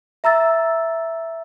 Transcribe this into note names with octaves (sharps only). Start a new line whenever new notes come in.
E5 A#5 E6 A6